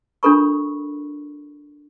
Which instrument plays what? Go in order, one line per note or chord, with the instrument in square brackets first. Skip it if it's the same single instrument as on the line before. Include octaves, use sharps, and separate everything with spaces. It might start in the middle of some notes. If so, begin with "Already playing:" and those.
[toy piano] D4 F4 A4 A#4 B5 C#6